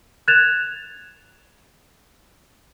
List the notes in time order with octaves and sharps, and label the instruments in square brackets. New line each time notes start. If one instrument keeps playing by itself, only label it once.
[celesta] F#6 G#6 A6 E7 F7